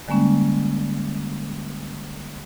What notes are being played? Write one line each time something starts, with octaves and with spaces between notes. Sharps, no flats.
D3 G3 G#3 A#3 C#4